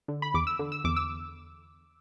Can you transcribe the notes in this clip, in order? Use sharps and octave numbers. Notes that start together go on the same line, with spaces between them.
D3
B5
E2 D6
E6
D3
E6
E2 D6
E6